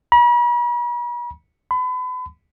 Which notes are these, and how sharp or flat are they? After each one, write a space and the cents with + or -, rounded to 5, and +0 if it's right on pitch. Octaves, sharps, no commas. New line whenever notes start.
B5 -45
B5 +35